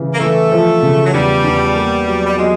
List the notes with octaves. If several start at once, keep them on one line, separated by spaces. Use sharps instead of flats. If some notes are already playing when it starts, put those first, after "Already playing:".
Already playing: C#3 E3 G3
A#3
E3 A3
F3
C#3
F#3
E2 G3
E2
A#3
F#3
G3
F#3 G#3